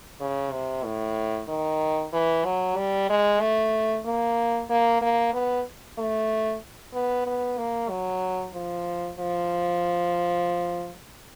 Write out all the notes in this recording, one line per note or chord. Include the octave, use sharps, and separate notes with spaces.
C#3
C3
A2
D#3
E3
F#3
G3
G#3
A3
A#3
A#3
A#3
B3
A3
B3
B3
A#3
F#3
F3
F3